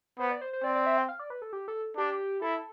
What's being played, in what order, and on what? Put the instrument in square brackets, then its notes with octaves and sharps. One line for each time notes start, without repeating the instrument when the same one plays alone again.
[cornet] B3 [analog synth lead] C5
[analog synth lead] D5
C5
C5
[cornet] C4 [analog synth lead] D5
[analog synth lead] D5
E5
G5
F5
D5
B4
A4
G4
A4
[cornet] D4 [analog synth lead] G4
[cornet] E4 [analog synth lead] A4